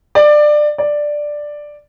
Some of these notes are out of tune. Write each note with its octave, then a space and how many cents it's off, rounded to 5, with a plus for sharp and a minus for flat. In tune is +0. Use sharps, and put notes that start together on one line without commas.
D5 +20
D5 +5